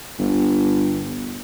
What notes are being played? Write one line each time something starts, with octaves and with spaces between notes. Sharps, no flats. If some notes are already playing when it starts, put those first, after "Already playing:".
G1